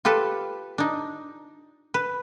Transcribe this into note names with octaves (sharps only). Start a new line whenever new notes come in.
F4 G4 A4 B4
D4 D#4
B4